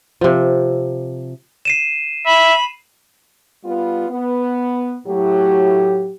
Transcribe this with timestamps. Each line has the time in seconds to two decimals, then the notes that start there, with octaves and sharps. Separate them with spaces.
0.21 C3 F3
1.65 C7 D#7 E7
2.26 E5 B5
3.65 G3 B3 F4
4.09 B3
5.07 A2 F#3 G4